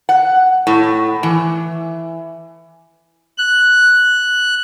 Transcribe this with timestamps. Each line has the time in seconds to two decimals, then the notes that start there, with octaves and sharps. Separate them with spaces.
0.09 F#5
0.67 A2
1.23 E3
3.38 F#6